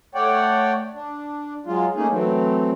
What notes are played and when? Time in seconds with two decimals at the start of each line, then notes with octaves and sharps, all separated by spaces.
0.15 A3 C#5 D5 F#5 G5
0.94 D4
1.66 F#3 G#3 F4
1.96 A3 A#3 C#4 D#4 G#4
2.11 E3 F#3 A3 C4